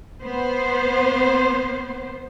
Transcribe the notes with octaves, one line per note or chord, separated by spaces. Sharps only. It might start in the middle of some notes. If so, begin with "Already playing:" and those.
B3 C5